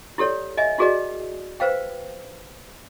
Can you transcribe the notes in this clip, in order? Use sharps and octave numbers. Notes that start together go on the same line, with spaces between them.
E4 G4 A4 C#5 D5
D#5 E5 G#5
E4 F#4 G#4 A#4 D5 D#5
B4 C5 F5 G5